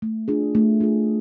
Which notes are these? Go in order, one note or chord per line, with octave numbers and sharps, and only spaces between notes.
A3
D4 F4 G#4
A3
D4 F4 G#4